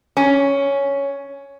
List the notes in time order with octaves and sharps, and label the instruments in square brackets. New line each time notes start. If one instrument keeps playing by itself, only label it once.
[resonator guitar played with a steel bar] C#4